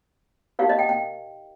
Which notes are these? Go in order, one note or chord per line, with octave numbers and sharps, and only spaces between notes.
D#4 G4 A#4 F5
D#5
G5
G5